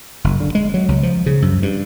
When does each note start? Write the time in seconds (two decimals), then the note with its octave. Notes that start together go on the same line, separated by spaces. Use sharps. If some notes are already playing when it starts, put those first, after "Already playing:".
0.24 F#1
0.40 D3
0.55 G#3
0.74 F#3
0.88 C#2
1.03 F3
1.26 C#3
1.42 F#2
1.62 G2